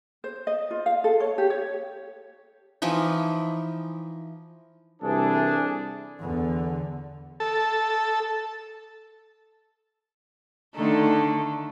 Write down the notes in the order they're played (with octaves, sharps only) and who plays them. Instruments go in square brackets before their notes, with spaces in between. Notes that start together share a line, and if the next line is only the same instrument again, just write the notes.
[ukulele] C5
D#5
F4
F5
A4
C#5
G4
C#5
[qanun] E3 F3 D#4 E4
[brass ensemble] C2 E3 A4 [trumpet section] D4 G#4
[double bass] E2 D3
[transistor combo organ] A4
[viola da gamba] D3 D#3 A3